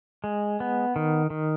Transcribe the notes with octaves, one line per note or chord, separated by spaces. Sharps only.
G#3
B3
D#3
D#3